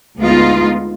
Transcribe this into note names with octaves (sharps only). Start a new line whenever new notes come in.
D2 G#3 B3 D#4 F4